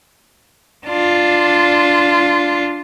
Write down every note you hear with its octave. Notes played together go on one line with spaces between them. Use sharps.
D4 F4